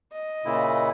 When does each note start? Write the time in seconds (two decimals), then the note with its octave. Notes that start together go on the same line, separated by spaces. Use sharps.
0.13 D#5
0.45 A#2 C#3 E4